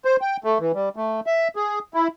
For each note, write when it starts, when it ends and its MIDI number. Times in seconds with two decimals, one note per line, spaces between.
0.05 0.16 72
0.21 0.37 79
0.44 0.58 57
0.60 0.72 52
0.74 0.89 55
0.96 1.20 57
1.27 1.48 76
1.56 1.79 68
1.94 2.08 64